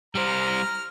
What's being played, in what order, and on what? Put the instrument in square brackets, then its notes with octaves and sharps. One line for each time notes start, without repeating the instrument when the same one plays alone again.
[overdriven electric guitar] G3 C5 [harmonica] A#5 F6